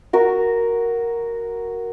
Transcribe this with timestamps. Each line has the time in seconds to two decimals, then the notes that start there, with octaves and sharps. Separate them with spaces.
0.13 F#4 A#4